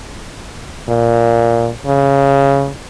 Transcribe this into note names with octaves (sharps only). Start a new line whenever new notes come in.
A#2
C#3